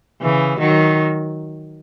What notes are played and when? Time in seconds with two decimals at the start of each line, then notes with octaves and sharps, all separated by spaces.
0.21 C#3 E3
0.59 D#3 F#3